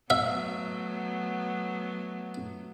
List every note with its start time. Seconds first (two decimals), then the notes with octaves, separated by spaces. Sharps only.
0.10 F#3 A3 B3 E5